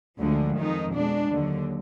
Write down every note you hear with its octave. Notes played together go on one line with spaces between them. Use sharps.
D2 D3 F3 G#3
F2 D#3 G#3 D#4
B2 G#3 D4
D#2 D3 F#3